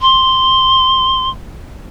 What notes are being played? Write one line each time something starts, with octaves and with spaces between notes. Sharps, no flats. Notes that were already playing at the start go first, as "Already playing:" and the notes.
C6